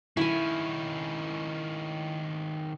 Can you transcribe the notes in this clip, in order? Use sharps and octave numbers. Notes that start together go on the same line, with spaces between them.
D#3 C#4 E4 G#5